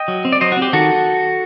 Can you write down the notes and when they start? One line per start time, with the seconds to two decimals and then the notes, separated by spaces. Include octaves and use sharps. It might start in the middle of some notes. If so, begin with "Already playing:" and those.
Already playing: D#5 G5
0.08 F#3
0.25 C4
0.32 D5
0.41 F#3 C5 D#5
0.52 F#4
0.57 C4
0.62 G4
0.73 D#3 F#4 A4